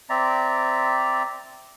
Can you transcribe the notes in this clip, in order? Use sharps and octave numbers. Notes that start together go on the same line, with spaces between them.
C4 D5 E5 A#5